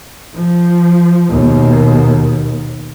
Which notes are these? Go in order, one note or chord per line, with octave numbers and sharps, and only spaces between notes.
F3
D#2 B2